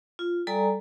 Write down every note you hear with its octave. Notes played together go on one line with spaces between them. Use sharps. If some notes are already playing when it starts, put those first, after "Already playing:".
F4
G3 A4 D5 G#5 A#5